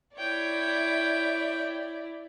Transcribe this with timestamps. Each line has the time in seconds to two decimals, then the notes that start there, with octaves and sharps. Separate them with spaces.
0.18 E4 C#5 D5 G5